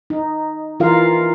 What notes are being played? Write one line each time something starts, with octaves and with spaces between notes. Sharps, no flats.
D#4
E3 F4 A#4 F5